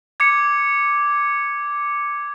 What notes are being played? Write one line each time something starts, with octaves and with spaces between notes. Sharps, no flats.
D6 G#6 C#7